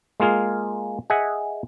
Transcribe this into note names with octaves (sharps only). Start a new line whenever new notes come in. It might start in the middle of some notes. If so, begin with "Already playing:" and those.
G#3 A#3 F4 G#4 F5
G#4 D#5 E5 F#5 G#5